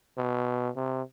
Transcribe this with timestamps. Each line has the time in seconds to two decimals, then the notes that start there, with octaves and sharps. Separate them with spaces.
0.17 B2
0.76 C3